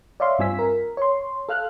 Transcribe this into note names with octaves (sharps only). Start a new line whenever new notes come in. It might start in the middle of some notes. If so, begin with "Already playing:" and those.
C#5 D5 E5 F5 C6
G2 C4 F4 G#5 E6 B6
A#4
C#5 C6
A4 F5 F6 F#6